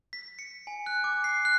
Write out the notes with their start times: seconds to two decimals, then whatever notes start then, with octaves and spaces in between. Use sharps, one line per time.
0.13 B6
0.39 C#7
0.67 G#5
0.86 F#6
1.04 D6
1.24 C7
1.45 F#6